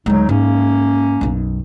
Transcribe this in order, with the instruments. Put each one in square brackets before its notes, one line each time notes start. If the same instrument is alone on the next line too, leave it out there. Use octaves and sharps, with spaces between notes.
[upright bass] D2 G#3 [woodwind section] F#3 D#4
[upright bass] G#2 [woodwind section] A#3 C#4
[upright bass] B1 F#2